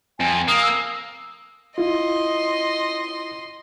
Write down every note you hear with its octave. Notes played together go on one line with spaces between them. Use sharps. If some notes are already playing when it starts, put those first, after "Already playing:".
F2 G#5
A#3 D#6
E6
E4 F4 D#5 C6